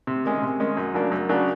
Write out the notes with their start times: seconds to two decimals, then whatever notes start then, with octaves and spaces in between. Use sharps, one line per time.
0.07 C3
0.25 D#3 G#3 C#4
0.42 C3
0.60 D#3 G#3 C#4
0.77 F#2
0.94 C#3 F#3 A#3 D4
1.12 F#2
1.29 C#3 F#3 A#3 D4